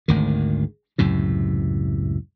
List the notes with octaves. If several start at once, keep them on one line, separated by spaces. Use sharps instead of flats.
G#1 D2 D#3
C#2 F#2 A2 C3